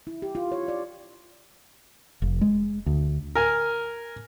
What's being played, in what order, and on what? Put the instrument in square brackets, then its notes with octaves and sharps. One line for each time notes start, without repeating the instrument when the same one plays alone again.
[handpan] E4
G4
F4
C#5
D5
[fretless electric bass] F1
G#3
D2
[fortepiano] A#4 G#5